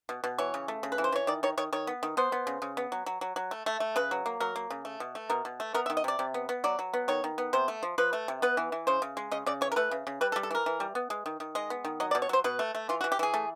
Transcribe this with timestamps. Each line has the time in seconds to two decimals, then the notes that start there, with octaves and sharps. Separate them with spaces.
0.09 B2
0.24 B2
0.38 E3 C#5
0.54 C#3
0.68 A3
0.83 C#3
0.92 B4
0.98 E3
1.04 C5
1.12 E3 C#5
1.27 D#3 D5
1.43 D#3 C#5
1.58 D#3 C#5
1.73 D#3 C#5
1.87 B3
2.03 D#3
2.17 B3 C5
2.32 B3
2.47 C#3
2.62 C#3
2.77 B3
2.92 F#3
3.06 F#3
3.21 F#3
3.36 F#3
3.51 A3
3.66 A3
3.80 A3
3.96 C#3 B4
4.11 F#3
4.26 A#3
4.40 F#3 A#4
4.56 A#3
4.70 C#3
4.85 A3
5.00 B2
5.15 A3
5.30 B2 A#4
5.45 B2
5.60 A3
5.74 B3 A#4
5.86 E5
5.90 D#3
5.97 D#5
6.04 C3 D5
6.19 C3
6.34 B3
6.49 B3
6.64 F#3 D5
6.79 F#3
6.94 B3
7.08 D#3 C#5
7.24 D#3
7.38 B3
7.53 C3 C5
7.68 A3
7.83 F3
7.98 F3 B4
8.13 A3
8.28 C3
8.42 B3 B4
8.57 E3
8.72 E3
8.87 C#3 C5
9.02 C#3
9.17 G#3
9.31 C#3 D#5
9.46 C#3 D5
9.61 E3 C#5
9.72 A#4
9.76 A3 B4
9.91 C#3
10.07 C#3
10.21 G3 B4
10.32 A4
10.36 G3
10.43 A4
10.51 E3 A#4
10.66 E3
10.80 G3
10.95 B3
11.10 G#3
11.26 D#3
11.40 D#3
11.55 G#3 D#5
11.70 B3
11.85 D#3
12.00 F#3 D#5
12.11 D5
12.15 B2
12.22 C#5
12.29 F#3 C5
12.44 B2 B4
12.59 A3
12.75 A3
12.89 E3 F4
13.01 F#4
13.04 E3
13.12 G4
13.19 E3 G#4
13.34 A3